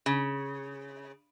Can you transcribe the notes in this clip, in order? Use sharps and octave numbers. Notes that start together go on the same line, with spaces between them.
C#3